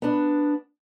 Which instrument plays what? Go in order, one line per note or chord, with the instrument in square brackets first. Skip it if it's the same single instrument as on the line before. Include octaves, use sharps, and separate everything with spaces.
[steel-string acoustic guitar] B3 D4